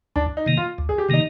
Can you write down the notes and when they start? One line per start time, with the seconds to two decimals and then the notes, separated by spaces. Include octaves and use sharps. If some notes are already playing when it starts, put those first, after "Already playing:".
0.16 D2 D4
0.37 D#4
0.46 C3 D#3 A#3
0.57 F4
0.78 D2
0.89 G#4
0.98 G4
1.09 C3 D#3 A#3 D#4